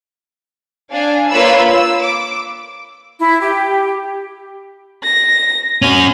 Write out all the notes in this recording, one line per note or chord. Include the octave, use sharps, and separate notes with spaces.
D4 F5 G#5
A#3 F4 B4 C#5 B5 E6
E6
D6
E4
G4
A#6
C#4 F#4 D#7